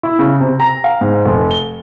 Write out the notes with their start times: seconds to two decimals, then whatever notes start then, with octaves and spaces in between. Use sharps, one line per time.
0.03 E4
0.19 C#3
0.40 C3
0.60 A#5
0.84 F5
1.01 G#2
1.26 F1
1.51 G7